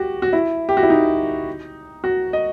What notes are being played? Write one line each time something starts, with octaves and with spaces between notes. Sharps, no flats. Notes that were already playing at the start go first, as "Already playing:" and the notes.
Already playing: F#4 G4
F#4
E4
G4
F#4
E4
D#4
F#4
D#5